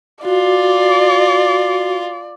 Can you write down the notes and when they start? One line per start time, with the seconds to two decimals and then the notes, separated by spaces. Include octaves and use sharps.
0.25 F4 F#4 D5